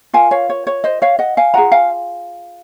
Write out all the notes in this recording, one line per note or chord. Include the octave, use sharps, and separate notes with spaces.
F4 A#4 F5 G#5
C#5 F5
C#5
C#5
C5 D#5
C#5 F5
D#5 F#5
F5 G#5
F4 G#4 F#5 A#5
F5 G#5